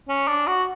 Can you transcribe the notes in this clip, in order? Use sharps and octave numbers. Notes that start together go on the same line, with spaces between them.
C#4
D4
F#4